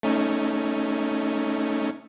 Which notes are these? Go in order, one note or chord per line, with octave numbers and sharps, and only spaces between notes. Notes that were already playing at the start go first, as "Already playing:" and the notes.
A3 C#4 D#4